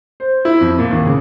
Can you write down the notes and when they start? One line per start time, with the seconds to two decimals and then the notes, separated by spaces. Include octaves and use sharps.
0.20 C5
0.45 E4
0.61 F2
0.79 A#2
0.91 D#2
1.06 C#3